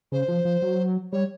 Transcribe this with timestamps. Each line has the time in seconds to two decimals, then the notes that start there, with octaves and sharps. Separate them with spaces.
0.12 C#3 C5
0.28 F3
0.45 F3
0.62 F#3
1.12 G3 C#5